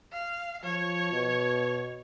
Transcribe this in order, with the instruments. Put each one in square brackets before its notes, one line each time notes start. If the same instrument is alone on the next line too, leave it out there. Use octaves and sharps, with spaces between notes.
[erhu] F5
[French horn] F3 [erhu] C#5
[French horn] B2